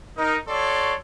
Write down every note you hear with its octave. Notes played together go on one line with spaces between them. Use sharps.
D#4 A#4
F#4 A4 C#5 D5 C6 C#6